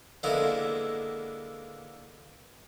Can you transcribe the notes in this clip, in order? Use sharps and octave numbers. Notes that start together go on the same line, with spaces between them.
D3 G#3 A#3 B3 E4